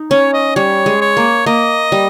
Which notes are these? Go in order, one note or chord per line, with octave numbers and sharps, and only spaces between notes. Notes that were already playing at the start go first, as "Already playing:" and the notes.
Already playing: D#4
C#4 C#5
D#5
G3 C#5
G#3
C#5
A#3
A#3 D#5
G3